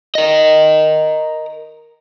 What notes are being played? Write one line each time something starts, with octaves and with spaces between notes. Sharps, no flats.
A#4 D#5